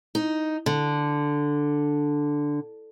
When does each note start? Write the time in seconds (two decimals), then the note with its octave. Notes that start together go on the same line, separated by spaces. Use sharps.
0.15 D#4
0.66 D3